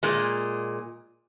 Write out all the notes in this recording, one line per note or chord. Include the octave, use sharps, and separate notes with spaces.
A#2 G#3